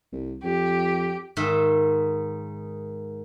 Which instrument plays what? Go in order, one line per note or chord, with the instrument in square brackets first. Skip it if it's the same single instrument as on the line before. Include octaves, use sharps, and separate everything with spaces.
[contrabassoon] C2
[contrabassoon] F2 [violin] G4
[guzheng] G#2 D#3 E5